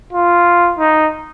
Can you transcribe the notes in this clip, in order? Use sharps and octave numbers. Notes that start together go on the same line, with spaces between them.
F4
D#4